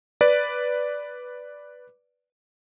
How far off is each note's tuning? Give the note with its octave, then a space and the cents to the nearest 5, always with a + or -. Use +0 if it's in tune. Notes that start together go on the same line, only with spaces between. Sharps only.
B4 +0 D5 -5